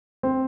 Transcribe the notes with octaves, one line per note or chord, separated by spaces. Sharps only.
C4